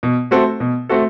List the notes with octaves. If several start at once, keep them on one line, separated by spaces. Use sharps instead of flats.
B2
A3 C4 F#4 A4
B2
A3 C4 F#4 A4